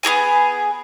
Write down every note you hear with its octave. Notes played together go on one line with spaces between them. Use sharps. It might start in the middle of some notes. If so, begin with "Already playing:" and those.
B3 F#4 G#4 G#5